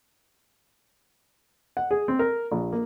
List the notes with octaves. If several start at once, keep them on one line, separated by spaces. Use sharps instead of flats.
F#5
G#4
C4
A#4
A#1
A#3